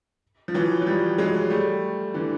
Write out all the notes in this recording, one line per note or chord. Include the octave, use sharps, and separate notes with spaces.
F3
E3 F#3
F#3
F3 G3
F#3 G#3
G3 A3
D3 E3